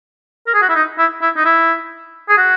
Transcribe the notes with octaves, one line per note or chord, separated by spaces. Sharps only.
A#4
G#4
F#4
E4
D#4
E4
E4
D#4
E4
G#4
F#4